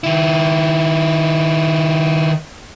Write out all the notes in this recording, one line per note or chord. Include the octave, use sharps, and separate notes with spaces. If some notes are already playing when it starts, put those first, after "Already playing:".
D#3 E4